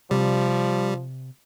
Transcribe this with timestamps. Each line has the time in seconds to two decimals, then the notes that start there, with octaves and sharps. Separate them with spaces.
0.11 C3 F3 G3 D5